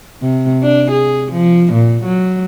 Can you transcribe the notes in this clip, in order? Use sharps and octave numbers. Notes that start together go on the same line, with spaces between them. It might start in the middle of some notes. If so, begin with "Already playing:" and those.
C3
D4
G#4
F3
A#2
F#3